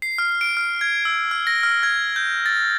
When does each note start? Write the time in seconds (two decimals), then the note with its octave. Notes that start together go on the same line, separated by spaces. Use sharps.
0.02 C7
0.18 F6
0.41 D7
0.57 F6
0.81 G#6
1.05 E6
1.31 F6
1.47 A#6
1.63 F6
1.83 G#6
2.16 G6
2.46 A6